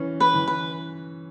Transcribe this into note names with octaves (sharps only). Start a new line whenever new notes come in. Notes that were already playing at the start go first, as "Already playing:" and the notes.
Already playing: E3 C#4
B4
E3
B4